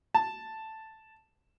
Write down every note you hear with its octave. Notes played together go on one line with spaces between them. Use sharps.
A5